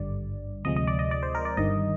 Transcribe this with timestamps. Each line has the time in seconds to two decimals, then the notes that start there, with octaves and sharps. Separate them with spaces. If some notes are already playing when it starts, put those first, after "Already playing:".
Already playing: G#1 G2 D3 G3 D5
0.64 D2 C3 F3 G#3 D#5
0.76 D#5
0.87 D5
0.99 D#5
1.11 D5
1.23 C5
1.35 A#4
1.45 D5
1.57 G1 G2 D#3 D#5